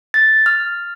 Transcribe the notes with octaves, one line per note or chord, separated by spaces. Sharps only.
A6
F6